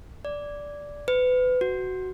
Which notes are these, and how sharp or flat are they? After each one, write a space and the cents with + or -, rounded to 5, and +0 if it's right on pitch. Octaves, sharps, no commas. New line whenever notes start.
D5 -10
B4 +30
F#4 +10